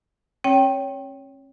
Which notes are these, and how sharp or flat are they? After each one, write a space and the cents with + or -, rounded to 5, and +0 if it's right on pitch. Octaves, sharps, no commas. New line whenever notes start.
C#4 -40 C#5 +15 G5 -5